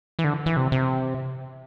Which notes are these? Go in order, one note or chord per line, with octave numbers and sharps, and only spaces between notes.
E3
D3
E3
C3
C3